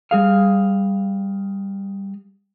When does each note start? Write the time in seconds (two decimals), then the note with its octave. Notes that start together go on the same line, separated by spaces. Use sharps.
0.11 G3 G#4 F5